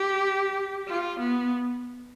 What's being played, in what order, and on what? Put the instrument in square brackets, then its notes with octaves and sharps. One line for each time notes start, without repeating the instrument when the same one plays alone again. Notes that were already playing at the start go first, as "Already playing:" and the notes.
Already playing: [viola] G4
F4
B3